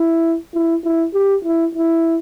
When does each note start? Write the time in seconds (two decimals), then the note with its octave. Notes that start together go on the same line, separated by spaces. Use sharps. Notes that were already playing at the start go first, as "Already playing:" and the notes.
Already playing: E4
0.54 E4
0.85 E4
1.14 G4
1.45 E4
1.75 E4